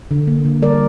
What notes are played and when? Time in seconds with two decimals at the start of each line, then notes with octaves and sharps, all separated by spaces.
0.11 D3
0.27 A#3
0.45 D3
0.62 G3 A#4 D5